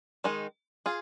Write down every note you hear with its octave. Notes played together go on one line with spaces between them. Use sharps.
D#3 G#3 D#4
F4 G#4